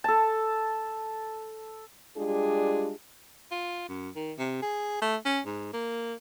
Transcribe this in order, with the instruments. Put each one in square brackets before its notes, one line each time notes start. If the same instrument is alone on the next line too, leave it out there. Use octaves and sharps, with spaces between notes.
[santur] A4 A5
[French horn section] G3 G#3 D4 F4 G4 G#4
[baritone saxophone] F4
F#2
D#3
C3
G#4
A3
C#4
G#2
A#3